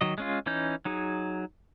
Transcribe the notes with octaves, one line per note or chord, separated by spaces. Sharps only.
D#3 F#3 D#5
G#3 C#4 F4
E3 C#4 D#4 G6
F#3 D#4 G#4